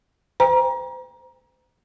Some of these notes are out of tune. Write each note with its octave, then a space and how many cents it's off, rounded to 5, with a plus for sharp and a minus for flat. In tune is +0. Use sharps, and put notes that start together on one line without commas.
C5 -25 G5 +40 A#5 +25